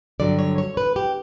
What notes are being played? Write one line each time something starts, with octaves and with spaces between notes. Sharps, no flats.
G2 D3 F#3 D5
C#5
C#5
B4
G4